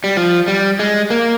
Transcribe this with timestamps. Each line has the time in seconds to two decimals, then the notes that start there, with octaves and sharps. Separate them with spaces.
0.04 G3
0.17 F3
0.48 G3
0.79 G#3
1.10 A#3